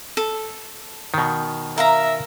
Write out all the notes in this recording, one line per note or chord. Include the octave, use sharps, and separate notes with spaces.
A4
B2 D#3
A#4 E5 F5 A#5